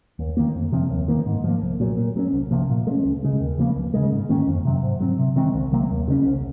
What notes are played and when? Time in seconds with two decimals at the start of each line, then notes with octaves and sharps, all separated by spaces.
0.19 D#2
0.37 D#3 A#3
0.55 F2
0.72 C3 F3 C4
0.90 D#2
1.08 D#3 A#3
1.26 G#2
1.44 F3 A#3
1.62 C2
1.80 A#2 F#3
1.97 A#2
2.16 F#3 A#3 C#4
2.33 C2
2.51 C3 F3 A#3
2.69 A#2
2.87 G#3
2.91 C#4
3.05 C#2
3.23 C#3 G#3
3.40 D#2
3.58 C#3 F3 A#3
3.76 C#2
3.94 C#3 G#3
4.12 G#2
4.29 D#3 A#3 C#4
4.47 F2
4.65 C3 F#3
4.83 G#2
5.00 F#3 C4
5.19 C3
5.36 D#3 G#3 C4
5.54 C2
5.72 C3 F#3 A#3
5.91 D#2
6.08 C#3 G#3 C#4
6.25 C2